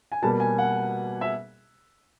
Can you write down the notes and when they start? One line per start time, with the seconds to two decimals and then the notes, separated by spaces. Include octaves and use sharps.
0.12 G#5
0.22 B2 G3 A#3 A5
0.40 G#5
0.58 F#5
1.21 E5